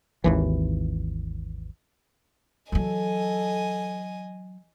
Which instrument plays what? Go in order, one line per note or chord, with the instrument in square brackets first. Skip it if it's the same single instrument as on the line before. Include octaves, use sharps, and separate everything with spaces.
[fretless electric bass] G#1 D#2 E3
[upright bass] E3 F#3 [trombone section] A4 [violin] D#5 G#5